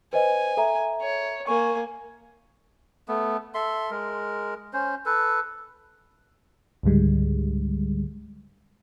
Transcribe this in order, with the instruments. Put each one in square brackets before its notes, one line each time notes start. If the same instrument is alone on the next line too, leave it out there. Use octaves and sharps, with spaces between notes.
[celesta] B4 C5 D#5 [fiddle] G#5
[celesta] A4 E5 A#5
[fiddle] C#5
[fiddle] A#3 G#5 [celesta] C#6
[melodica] A3 B3
A4 E5 C6
G#3 A#4
C#4 C5
A4 B4
[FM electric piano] C#2 G#2 D3 G3 G#3